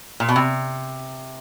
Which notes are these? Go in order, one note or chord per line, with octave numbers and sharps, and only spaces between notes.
A#2
B2
C3